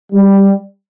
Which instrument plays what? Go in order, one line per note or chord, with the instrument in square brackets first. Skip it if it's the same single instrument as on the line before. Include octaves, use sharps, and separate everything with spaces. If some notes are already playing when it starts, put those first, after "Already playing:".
[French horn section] G3